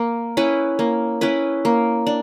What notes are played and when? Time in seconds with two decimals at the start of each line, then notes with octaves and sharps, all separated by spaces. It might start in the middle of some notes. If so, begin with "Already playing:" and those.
Already playing: A#3
0.37 C#4 E4 B4
0.79 A#3
1.21 C#4 E4 B4
1.65 A#3
2.07 D4